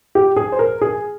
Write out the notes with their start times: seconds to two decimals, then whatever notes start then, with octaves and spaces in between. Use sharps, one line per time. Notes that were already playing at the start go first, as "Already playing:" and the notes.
0.15 G4
0.36 G#4
0.52 C5
0.59 A#4
0.81 G#4